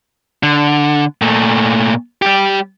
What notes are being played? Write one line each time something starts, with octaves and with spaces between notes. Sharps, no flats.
D3
A#2 A3
G3 G4